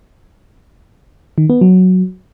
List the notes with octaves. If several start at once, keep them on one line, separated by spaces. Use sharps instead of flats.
D#3
B3
F#3